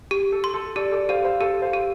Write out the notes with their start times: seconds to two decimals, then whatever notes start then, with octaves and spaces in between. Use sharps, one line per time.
0.11 G4
0.32 A4
0.44 C6
0.54 A4
0.76 G4 A4 D5
0.92 A4 D5
1.09 G4 C5 F5
1.24 C5 F5
1.40 G4 A4
1.62 C5 F5
1.73 G4